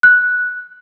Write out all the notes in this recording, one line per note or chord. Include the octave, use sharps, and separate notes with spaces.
F#6